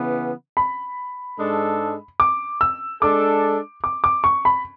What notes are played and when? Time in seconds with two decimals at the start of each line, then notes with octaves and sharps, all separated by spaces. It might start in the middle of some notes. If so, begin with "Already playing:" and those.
Already playing: C#3 E3 B3
0.57 B5
1.39 G#2 G#3 D4 A4
2.20 D6
2.61 E6
3.02 G#3 D4 A4 D6
3.84 D6
4.04 D6
4.24 C#6
4.45 B5